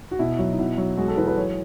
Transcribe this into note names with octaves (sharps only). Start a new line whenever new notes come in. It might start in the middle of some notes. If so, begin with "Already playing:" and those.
F#4
B2 E4
F#3 F#4
D#4
B2 E4
F#3
G#3 F#4
A4
E3 B4
B4
F#3 C#5